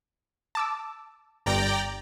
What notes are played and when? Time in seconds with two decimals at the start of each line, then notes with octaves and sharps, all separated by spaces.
0.55 A5 D6 E6
1.46 G1 G2 G3 D5 G5 A#5